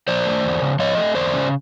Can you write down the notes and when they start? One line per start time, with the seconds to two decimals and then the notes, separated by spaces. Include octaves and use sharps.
0.08 F3 C5 D5
0.26 A3
0.44 E2
0.62 C#3
0.79 F3 C#5 D#5
0.97 A3
1.15 E2 C5 D5
1.33 C#3